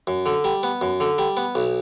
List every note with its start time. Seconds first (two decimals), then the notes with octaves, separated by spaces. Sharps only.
0.07 F#2
0.26 D3
0.44 G3
0.63 B3
0.81 F#2
1.00 D3
1.18 G3
1.37 B3
1.55 B1